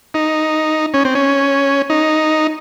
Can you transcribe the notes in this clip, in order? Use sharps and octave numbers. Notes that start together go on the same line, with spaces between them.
D#4
C#4
C4
C#4
D#4